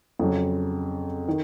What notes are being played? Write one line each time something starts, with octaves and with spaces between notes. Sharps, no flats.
F2 C#3 F#3
D#3